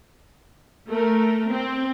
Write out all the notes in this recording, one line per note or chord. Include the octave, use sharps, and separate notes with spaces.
A3 A#4
C4